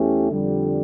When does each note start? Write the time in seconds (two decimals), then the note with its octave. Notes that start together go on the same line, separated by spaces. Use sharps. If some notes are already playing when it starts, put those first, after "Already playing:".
Already playing: E2 E3 A3 C#4 G4
0.30 F2 D3 G3